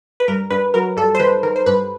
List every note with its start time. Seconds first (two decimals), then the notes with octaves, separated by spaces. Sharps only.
0.20 B4
0.28 G2 A#4
0.50 G2 B4
0.74 F#3 A#4
0.97 G2 A4
1.15 C5
1.20 D#3 B4
1.43 D#3 A#4
1.56 C5
1.66 G2 B4